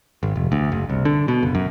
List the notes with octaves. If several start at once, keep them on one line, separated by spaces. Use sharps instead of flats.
G#1
F1
D2
F#1
C2
D3
B2
F#1
F#2